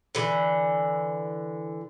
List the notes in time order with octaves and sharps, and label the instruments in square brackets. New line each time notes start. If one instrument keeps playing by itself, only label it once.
[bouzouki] D3 E3